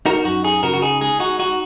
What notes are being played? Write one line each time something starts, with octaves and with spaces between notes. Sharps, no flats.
D#4 F#4 A#4
F#2 F#4
D#4 G#4
C#3 F#4 A#4
F#4
D#4 G#4
G#3 G#4
D#4 F#4
D#4 F#4